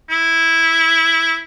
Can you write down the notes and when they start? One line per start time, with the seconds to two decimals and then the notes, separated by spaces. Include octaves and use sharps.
0.09 E4